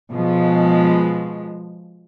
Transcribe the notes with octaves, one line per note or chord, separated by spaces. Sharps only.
B2 F3 G#3